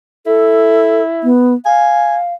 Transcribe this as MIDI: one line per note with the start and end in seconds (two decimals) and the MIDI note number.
0.26 1.29 64
0.26 1.02 69
1.24 1.54 59
1.65 2.34 77
1.65 2.17 80